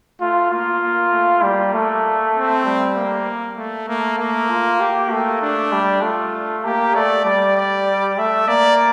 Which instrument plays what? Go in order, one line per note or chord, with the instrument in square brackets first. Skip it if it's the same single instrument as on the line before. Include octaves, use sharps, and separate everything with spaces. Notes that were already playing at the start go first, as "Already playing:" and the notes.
[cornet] A3 [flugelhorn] F4
[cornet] A#3 [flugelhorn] F4
[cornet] A#3
A3
[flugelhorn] G3 [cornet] A#3
[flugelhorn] A3
[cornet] C4
[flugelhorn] G3
[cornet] A#3
A3
[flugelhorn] A3 [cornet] A#3
[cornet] A#3
[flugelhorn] F4
G4
[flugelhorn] A3 [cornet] A#3
[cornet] D4
[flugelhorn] G3
[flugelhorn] A3 [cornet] F4
[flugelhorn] A#3 [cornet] G4
[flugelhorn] A3 [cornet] D5
[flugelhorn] G3 [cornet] D5
[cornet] D5
[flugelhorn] A3 [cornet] E5
[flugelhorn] A#3 [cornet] D5